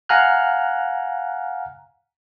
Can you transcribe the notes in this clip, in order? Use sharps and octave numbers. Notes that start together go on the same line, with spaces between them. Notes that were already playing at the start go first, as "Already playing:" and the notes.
F5 F#5 G#5 A#5 F6 F#6